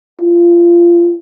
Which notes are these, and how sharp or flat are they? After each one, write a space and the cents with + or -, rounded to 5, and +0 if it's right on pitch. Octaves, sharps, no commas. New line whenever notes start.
F4 -25